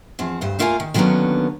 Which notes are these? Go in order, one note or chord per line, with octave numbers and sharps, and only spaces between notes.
E2 F3 C4
D2 G2 C5
A3 A#3 F4 A#4 F5 G#5
D#3
D3 D#3 F#3 A#3 B3 C#4